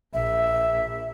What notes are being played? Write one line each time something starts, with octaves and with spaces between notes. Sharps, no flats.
A#1 E5